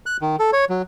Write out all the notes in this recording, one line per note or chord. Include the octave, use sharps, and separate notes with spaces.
F#6
D#3
A4
C#5
F#3